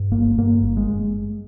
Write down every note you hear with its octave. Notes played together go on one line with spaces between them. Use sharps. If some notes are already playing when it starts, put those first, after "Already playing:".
Already playing: G2
G1 A#3
G2 A#3
G1
G#3